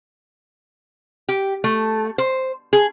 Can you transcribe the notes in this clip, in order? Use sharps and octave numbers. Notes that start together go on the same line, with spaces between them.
G4
A3
C5
G#4